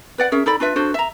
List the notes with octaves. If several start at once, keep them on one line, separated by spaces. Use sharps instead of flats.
B4 D5 F#5
C#4 G#4 A#4 E5
D#4 A4 D5 B5
D4 F4 B4 E5
D4 F#4 A4 C5
E5 A#5